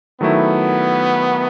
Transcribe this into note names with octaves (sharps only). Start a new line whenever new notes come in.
D#3 F#3 A3 B3 E4